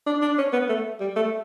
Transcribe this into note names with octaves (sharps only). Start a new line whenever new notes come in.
D4
D4
C#4
B3
A3
G3
A3